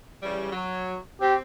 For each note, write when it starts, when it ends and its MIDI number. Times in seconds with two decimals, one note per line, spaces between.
0.23 0.52 49
0.23 0.52 52
0.23 0.52 55
0.53 0.96 54
1.21 1.41 60
1.21 1.35 67